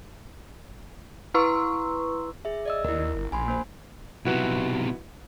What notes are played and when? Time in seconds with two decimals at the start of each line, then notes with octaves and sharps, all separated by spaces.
1.34 E4 B4 A#5 C6 C#6 E6
2.45 G#4 E5
2.66 D5 D#5 E6
2.84 D#2 E4 A#4
3.14 G1
3.32 A#1 G#5 B5 C6
3.48 A#3 C5 G#5
4.25 B1 C3 E4 F#4 B4